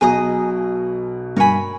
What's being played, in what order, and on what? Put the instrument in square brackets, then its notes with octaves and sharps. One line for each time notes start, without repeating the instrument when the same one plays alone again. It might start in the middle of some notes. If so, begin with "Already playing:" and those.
[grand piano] B1 B2 [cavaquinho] G#4 D#5 A#5 D#6
[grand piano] G2 [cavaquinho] A#4 C#5 G#5 B5